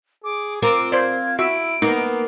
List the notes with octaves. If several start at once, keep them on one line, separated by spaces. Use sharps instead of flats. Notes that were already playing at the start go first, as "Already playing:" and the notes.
G#4 D6
C4 F4 A#4 D6 D7
C5 D5 F5 G#6
E4 F#4 E5 D7
A#3 B3 D#4